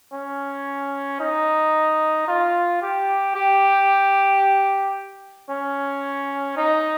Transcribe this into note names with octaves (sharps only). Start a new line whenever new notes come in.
C#4
D#4
F4
G4
G4
C#4
D#4